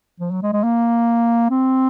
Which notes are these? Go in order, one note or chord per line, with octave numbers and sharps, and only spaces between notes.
F3
F#3
G#3
G#3
A#3
C4